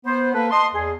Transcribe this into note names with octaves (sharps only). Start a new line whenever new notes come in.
B3 C5
A#3 A4 B4
D#5 A5 C6
E2 G#4